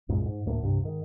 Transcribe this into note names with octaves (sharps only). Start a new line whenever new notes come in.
C2 F#2 A#2 G#3
G#2
D2 A2 A#3
C2 G2 C3
G#2 D#3